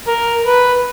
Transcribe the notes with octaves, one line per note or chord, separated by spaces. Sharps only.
A#4
B4